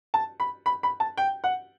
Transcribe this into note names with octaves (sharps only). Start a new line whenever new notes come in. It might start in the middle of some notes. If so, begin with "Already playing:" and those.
A5
B5
B5
B5
A5
G5
F#5